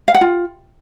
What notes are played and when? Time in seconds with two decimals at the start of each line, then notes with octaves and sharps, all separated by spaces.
0.08 F5
0.15 F#5
0.21 F4